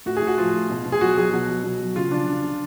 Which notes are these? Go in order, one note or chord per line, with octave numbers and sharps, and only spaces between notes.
A2 F#4
G#4
A2
F#4
F3 F4
A2
B2
B2
G#4
F#3 F#4
F#3 G#4
B2 F#4
F#3
B2
F#3
C#3 F4
F3 D4
C#3
C#3